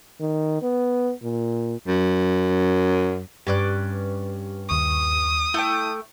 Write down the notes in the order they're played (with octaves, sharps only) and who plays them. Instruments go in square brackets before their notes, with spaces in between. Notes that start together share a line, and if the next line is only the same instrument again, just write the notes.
[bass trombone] D#3
B3
A#2
[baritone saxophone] F#2
[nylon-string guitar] G2 [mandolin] C#4 D5 F#6 [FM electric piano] G4 B4
[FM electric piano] D#2 C#6 [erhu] D#6
[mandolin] A3 G5 [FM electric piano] E4 A5